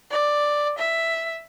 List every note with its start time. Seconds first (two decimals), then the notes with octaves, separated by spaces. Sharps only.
0.11 D5
0.79 E5